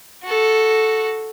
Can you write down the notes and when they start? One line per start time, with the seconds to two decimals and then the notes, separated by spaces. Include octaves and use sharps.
0.23 F#4 A4